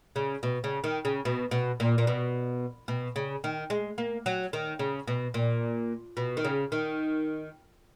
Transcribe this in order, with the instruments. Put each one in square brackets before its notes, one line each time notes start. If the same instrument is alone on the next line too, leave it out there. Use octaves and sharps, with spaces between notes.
[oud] C#3
B2
C#3
D#3
C#3
B2
B2
A#2
A#2
B2
B2
C#3
D#3
G#3
A#3
F#3
D#3
C#3
B2
A#2
B2
D#3
C#3
D#3